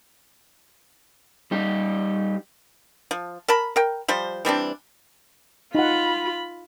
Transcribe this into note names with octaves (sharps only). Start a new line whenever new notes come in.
G3 D#4 G4
F3
A#4 A5 B5
A#4 G5
F3 G3 C5
E3 G3 C4 D4
D#4 F4 F#5 B5